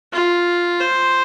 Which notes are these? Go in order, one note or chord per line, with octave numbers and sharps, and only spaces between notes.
F4
C5